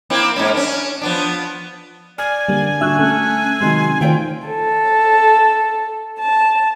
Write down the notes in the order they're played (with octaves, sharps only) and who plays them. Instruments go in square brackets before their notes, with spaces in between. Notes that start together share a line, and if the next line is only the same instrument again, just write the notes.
[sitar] A#3 C4 E4
G#2 A#3 C#4
C#4 D4
F3 B3 D4
[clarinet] D5 [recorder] G#5 [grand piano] F6
[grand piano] D3 [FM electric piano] G3 A#3
[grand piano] D3 D4 [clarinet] F#4 [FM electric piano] E5 E6 F#6
[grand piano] A3 [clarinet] C#4
[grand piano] C3 D#3 F#3 [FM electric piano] G#3 [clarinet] C6
[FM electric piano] D#3 A3 [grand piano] F4 C5 [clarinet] A4 [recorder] G5
[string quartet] A4
A5